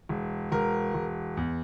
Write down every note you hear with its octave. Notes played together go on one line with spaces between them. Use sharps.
E1
E1 A#4
E1
E2